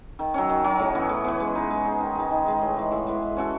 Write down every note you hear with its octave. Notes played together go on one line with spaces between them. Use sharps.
D#3
F#3 C#4
D#3
F#3 C#4
A2
E3 B3
A2
E3 B3
G#3
D#4 G#4
G#3
D#4 G#4
D#3
G#3 D#4 G#4
D#3
G#3 D#4 G#4
A2
E3 G#3
A2
E3 G#3
G#3
C#4 F#4 A4